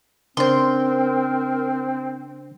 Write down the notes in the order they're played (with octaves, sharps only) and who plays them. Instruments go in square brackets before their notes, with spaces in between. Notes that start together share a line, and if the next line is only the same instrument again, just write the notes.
[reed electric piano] C#3 D4 C5 [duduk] C4 [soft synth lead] A#4 [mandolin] C6 G6